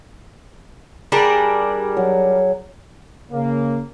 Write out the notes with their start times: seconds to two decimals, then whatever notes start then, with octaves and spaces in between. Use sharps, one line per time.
1.12 G3 D4 G#4 A#4
1.97 F#3
3.31 C#3 A#3